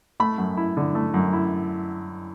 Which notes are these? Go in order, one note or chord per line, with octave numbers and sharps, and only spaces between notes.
A3 B5
F#2
E4
D3
A3
F#2
E4